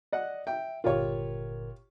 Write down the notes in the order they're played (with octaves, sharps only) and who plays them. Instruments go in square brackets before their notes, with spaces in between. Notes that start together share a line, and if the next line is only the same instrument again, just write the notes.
[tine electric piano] D5 [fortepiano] D#5 F#5
[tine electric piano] E5 [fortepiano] G5
[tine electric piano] G1 A#2 A#4 [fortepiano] F4 G4 C#5